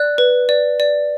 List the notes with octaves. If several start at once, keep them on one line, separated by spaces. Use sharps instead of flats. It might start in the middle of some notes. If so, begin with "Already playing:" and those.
Already playing: D5 F#6
B4
D5
D5